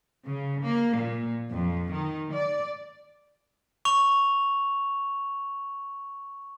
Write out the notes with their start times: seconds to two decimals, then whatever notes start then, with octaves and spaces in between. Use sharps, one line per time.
0.24 C#3
0.63 A#3
0.98 A#2
1.50 F2
1.92 D#3
2.33 D5
3.85 C#6 F7